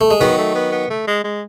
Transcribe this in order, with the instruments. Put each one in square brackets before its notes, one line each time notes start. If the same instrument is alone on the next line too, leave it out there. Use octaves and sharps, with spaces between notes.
[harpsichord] A3
G#3
[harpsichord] D#3 F#3 [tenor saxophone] B3
[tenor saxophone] A3
B3
B3
A3
G#3
G#3